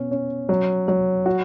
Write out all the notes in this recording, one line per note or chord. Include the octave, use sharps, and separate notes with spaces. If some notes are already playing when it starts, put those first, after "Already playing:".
Already playing: B2 C#4
C#4
F#3
F#3
F#4